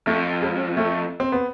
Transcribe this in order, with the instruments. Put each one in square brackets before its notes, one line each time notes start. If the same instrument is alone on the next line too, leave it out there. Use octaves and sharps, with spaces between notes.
[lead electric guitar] F2 [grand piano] A3
[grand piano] G#3
A3
C4
B3